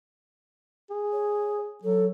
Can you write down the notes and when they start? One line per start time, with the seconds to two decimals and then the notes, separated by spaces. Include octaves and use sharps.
0.90 G#4
1.12 C#5
1.83 F#3 A4